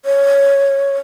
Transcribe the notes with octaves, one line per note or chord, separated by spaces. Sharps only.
C#5